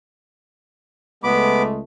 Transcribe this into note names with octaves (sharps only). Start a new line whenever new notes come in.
C#2 G#3 A3 B3 B5 D6